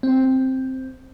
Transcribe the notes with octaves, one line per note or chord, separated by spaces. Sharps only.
C4